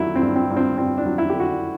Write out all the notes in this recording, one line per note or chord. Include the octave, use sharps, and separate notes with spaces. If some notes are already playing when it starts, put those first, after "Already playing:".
Already playing: D3 F#3 E4
C4
G2
C4
G2
C4
G2 C4
D4
F#3
E4
D3 G4
F#4